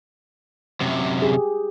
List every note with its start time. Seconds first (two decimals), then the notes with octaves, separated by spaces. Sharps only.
0.81 F#2 C3
1.22 G4 G#4